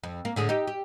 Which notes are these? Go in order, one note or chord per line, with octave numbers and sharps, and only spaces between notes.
F2
A#3
A2 D3 G#4
D#4 G4
G4